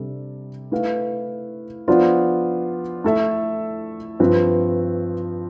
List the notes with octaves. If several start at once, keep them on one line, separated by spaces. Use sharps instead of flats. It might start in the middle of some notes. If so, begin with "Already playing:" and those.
Already playing: C3 G3 D4 A4
A3 E4 B4 F5
F3 B3 D4 F4 C5
A3 E4 A4 E5
G2 F3 C4 F4 B4